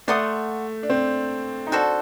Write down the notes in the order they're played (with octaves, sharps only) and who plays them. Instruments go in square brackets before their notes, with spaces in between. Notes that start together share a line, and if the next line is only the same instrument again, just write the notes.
[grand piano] A3 [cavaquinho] D5 F#5 C6 D#6
[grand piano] D4
C4
D#4
[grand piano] D4 [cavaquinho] F#4 A4 C5